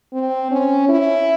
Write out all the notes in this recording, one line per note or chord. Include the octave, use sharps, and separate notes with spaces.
C4
C#4
E4